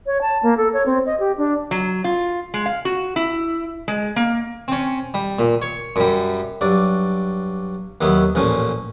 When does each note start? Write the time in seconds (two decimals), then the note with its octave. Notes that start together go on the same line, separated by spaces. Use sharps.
0.06 C#5
0.22 A5
0.43 A#3
0.57 A4
0.73 C#5
0.86 C4
1.06 D#5
1.20 G4
1.38 D4
1.71 F#3
2.04 F4
2.54 G#3
2.66 F5
2.85 F#4
3.16 E4
3.88 G#3
4.16 A#3
4.68 C4 C#4
5.14 G3
5.39 A#2
5.62 C#5
5.96 F#2 G3
6.61 G2 F#3 D5
8.01 D#2 D#3 F#3 B3 E4
8.35 A1 A#2 F3 C#4